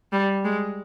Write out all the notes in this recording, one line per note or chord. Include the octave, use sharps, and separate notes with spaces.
G3
G#3